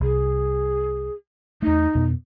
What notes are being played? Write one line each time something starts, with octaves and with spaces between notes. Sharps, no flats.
C2 G#4
E2 A3 D#4
F2 B2 B3